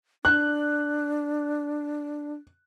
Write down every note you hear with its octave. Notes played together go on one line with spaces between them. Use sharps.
D4 F#6